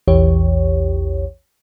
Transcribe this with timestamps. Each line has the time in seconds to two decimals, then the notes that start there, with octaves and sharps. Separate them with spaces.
0.08 A#1 E2 E3 G4 C#5